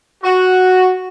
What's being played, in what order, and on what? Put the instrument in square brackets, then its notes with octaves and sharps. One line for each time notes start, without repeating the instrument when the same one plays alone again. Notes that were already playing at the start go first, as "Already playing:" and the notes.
[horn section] F#4